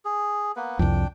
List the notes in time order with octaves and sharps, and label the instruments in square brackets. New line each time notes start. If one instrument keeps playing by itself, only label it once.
[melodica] G#4
A#3 B3 B4
[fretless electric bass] C2 F2 [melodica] D4 G5